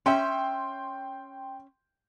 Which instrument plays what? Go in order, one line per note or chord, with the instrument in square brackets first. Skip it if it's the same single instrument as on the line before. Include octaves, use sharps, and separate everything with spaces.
[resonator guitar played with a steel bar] C#4 E5 [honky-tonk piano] G5 C6